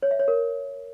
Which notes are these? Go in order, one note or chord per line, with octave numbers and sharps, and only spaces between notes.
C#5
E5
C#5
A#4